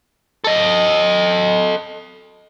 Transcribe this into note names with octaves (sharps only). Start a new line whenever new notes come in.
A4 D#5